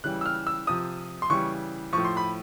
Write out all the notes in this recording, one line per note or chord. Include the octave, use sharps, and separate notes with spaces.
C#3 E3 G3 F#6
E6
F6
E6
C3 F3 D#6
C6
C#3 E3 G3 C#6
A2 F3 C#6
C6
B5